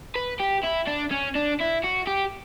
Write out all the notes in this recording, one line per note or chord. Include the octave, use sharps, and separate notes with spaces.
B4
G4
E4
D4
C#4
D4
E4
F#4
G4